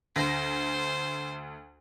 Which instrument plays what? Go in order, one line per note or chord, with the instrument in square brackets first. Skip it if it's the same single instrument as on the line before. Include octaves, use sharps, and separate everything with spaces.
[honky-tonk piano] D2 A#6 [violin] C5